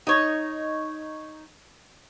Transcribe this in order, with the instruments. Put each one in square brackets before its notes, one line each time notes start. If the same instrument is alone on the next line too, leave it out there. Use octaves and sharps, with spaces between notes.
[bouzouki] D#4 C#5